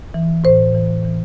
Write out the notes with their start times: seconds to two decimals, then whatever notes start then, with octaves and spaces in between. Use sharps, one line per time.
0.14 E3
0.44 A2 C5
0.75 E3
1.05 E3